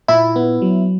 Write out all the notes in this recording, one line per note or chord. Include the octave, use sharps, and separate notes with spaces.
A#2 E4
B3
F#3